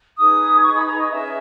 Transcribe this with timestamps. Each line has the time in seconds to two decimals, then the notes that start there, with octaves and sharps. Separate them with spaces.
0.18 D#4 G#4 B4 D#6
0.65 C#6
0.76 B5
0.88 A#5
0.99 D#5
1.10 C#4 G#4 B4 E5